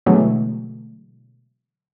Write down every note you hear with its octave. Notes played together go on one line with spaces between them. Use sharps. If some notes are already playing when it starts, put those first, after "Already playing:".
B2 D3 E3 F#3 G#3 A3